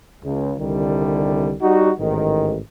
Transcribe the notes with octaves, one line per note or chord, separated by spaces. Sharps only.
C#2
C2 D3 D#3 G3
G3 D#4 F#4
A1 G#2 D#3